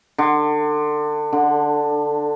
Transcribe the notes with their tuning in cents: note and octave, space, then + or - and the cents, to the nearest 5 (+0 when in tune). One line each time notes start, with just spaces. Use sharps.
D3 +30
D3 +5